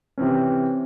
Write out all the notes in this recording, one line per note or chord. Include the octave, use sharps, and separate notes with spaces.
C3 E3 C4 C#4